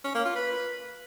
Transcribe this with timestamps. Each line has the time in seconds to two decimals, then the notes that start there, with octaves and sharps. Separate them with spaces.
0.04 C#4
0.15 A#3
0.25 F4
0.36 B4